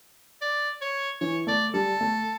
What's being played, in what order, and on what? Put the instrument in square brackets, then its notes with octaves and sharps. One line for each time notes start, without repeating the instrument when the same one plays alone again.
[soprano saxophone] D5
C#5
[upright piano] E3 [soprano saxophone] C#5
[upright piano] A3 [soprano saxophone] D5
[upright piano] G3 [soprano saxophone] A4
[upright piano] A3